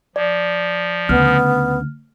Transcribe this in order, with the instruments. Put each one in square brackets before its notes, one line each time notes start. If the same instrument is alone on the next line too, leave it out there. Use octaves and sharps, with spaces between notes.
[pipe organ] F3 [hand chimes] D5
[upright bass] D2 C#3 [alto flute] B3 [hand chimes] F6